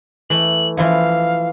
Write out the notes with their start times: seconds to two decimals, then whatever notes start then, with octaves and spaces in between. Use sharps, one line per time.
0.30 E3 A3 F#7
0.77 E3 F3 E4 F5